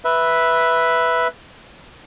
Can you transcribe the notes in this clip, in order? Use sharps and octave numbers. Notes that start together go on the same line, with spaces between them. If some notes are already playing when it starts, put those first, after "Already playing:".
B4 E5